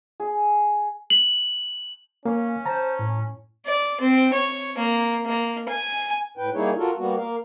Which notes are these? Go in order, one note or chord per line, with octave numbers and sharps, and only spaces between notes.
G#4
F#7
A#3 C#4 F5
C5 A5 A#5
A2
D5
C4
C#5
A#3
A#3
G#5
A2 B4 G5
G3 A#3 D#4 E4 G#4 C#5
F4 F#4 A4 A#4
G3 A#3 B3 F#4
A#3 A#4 F5